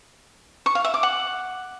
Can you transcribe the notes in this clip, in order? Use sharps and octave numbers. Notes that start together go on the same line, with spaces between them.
C#6
F5
E5
D6
F#5